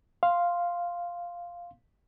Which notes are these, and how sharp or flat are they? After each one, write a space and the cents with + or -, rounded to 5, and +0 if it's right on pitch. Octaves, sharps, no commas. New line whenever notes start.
F5 +0 C6 +0